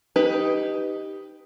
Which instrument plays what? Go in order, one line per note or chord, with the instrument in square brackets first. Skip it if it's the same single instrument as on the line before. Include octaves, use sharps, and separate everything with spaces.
[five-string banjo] D#4 G4 B4